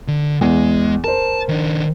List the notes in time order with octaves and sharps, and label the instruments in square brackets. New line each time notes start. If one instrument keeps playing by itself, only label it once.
[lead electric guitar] D3
[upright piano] E2 [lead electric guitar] G#3
[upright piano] A#4 C5 [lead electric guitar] A5
[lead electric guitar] D#3 D4